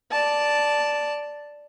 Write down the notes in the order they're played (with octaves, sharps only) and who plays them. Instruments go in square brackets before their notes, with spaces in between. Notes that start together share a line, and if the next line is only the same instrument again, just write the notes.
[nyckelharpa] D5 A5